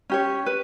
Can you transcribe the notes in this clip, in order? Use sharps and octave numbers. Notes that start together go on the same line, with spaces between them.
C#4 G4 C#5
B4